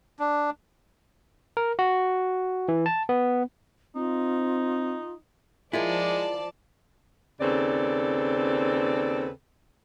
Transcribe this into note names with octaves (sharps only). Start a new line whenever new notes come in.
D4
A#4
F#4
E3
A5
B3
C4 D#4 F4
F3 G#3 E4 F4 A#4 D5 A5
D#2 C#3 C4 A4 B4 D5